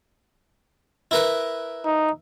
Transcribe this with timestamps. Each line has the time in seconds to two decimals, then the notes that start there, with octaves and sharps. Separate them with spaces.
1.11 E4 A#4 B4
1.85 D#4